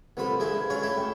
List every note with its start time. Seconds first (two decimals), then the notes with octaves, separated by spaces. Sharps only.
0.17 C2 F3 B3 A4 B5
0.40 F3 G#3 D4 E4
0.70 F#3 C#4 F4 C#5
0.83 F#3 A3 E4 A4
0.97 D2 G5